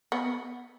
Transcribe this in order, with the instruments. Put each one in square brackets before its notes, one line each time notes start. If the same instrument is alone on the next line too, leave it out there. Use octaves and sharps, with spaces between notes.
[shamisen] B3